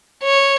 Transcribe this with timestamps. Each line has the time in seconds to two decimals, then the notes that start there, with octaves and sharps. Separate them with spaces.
0.23 C#5